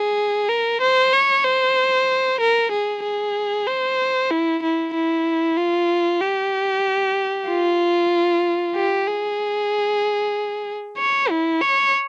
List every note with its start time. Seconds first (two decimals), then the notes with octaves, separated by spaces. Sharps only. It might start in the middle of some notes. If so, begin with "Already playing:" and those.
Already playing: G#4
0.49 A#4
0.81 C5
1.13 C#5
1.44 C5
2.40 A#4
2.71 G#4
3.03 G#4
3.67 C5
4.31 E4
4.63 E4
4.95 E4
5.57 F4
6.21 G4
7.48 F4
8.76 G4
9.07 G#4
10.98 C#5
11.30 E4
11.61 C#5